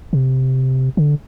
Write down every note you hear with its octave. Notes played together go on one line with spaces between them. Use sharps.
C3
D3